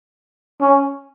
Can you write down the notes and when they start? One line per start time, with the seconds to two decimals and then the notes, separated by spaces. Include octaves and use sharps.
0.61 C#4